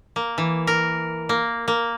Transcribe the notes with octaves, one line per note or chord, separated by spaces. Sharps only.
A#3
E3
A#4
A#3
A#3